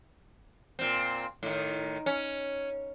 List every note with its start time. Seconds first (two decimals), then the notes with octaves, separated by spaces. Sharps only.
0.79 A#2 C4
1.43 A2 D#3
2.06 C#4